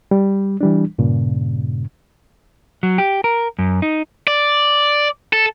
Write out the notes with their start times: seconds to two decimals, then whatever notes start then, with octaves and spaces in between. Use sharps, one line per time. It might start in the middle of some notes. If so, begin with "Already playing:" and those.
0.11 G3
0.61 E3 G3 D4
0.98 G2 A#2 C#3
2.83 F#3
2.98 G4
3.24 A#4
3.59 F#2
3.82 D#4
4.27 D5
5.33 A4